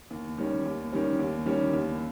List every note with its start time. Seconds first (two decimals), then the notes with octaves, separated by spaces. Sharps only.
0.10 D#2
0.38 D#3 G3 C#4
0.66 D#2
0.93 D#3 G3 C#4
1.19 D#2
1.46 D#3 G3 C#4
1.73 D#2